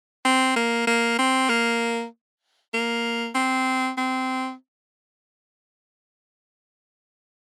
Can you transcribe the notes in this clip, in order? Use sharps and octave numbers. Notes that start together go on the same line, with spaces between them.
C4
A#3
A#3
C4
A#3
A#3
C4
C4